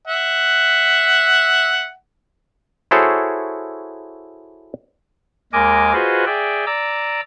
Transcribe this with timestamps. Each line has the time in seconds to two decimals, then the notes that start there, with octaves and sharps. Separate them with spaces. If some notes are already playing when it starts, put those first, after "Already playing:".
0.08 E5 F#5
2.91 E4 F#4 G#4 A4 C5 C#5
5.53 D#2 G#3 A#4 D#5 G#5 D6
5.93 F4 F#4 G#4 B4 C5 D#5
6.26 G#4 D5 E5 G5
6.66 D5 A#5 D6 E6